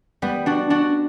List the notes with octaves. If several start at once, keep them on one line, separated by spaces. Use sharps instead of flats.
G3 B3
D4 F#4
D4 F#4